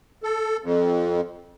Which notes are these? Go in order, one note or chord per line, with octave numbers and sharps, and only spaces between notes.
A4
F2